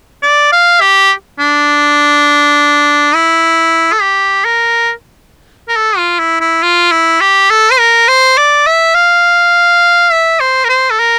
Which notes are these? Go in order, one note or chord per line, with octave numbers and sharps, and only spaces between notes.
D5
F5
G4
D4
E4
A4
G4
A#4
A#4
A4
F4
E4
E4
F4
E4
G4
A4
C5
A#4
C5
D5
E5
F5
E5
C5
A#4
C5
A4
A#4